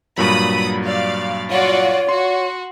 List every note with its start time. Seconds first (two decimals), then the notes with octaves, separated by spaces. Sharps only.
0.18 G2 A#2 F#3 B5 D#6
0.85 D5 F5
1.51 F4 F#4 C#5 D5
2.09 F#4 C6